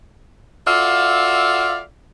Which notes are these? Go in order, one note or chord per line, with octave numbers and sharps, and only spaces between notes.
F4 F#4 A4 D5 E5 F5